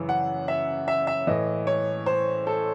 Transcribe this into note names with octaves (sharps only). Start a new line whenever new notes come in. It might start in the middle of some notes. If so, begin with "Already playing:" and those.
Already playing: F#2 C#3 E3
F#5
E5
E5
E5
A2 E3 D#5
C#5
C5
A4